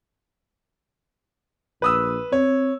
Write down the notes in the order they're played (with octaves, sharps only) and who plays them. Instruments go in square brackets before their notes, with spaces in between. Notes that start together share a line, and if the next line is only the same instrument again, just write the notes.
[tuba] A#1 [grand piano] B4 D#6 E6
[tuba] C4 [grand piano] C#5